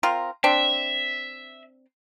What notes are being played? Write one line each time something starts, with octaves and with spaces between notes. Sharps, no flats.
C4 F4 A#4
C4 D4 E5